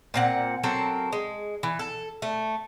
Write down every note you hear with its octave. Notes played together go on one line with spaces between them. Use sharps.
A#2 C4 F#5
F#3 C4 A4 A#4
G#3
E3
A4
A3